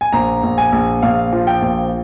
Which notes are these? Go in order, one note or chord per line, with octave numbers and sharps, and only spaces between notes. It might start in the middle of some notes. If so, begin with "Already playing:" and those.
G#5
A#1 A#5
A#1
G#5
A#1
A#1 F5
F3
G5
A#1